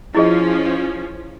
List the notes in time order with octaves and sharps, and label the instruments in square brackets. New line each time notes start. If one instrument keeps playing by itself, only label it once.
[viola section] F3 C#4 [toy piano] E4 G#4 D#5